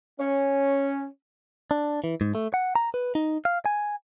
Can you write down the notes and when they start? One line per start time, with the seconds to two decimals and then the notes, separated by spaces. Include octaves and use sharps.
0.20 C#4
1.71 D4
2.04 E3
2.21 G#2
2.35 A3
2.54 F#5
2.76 A#5
2.94 B4
3.15 D#4
3.45 F5
3.66 G#5